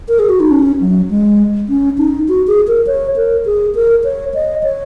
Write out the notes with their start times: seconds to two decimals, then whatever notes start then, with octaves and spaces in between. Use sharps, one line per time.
0.08 A#4
0.19 G#4
0.29 F#4
0.40 D#4
0.51 C#4
0.81 F#3
1.10 G#3
1.69 C#4
1.98 D#4
2.28 F#4
2.47 G#4
2.68 A#4
2.87 C#5
3.16 A#4
3.46 G#4
3.75 A#4
4.04 C#5
4.34 D#5
4.63 C#5